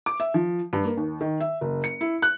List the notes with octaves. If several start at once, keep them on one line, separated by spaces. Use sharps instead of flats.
D6
E5
F3
G2
A#3
D#2
D#3
E5
F#1
C#7
E4
F#6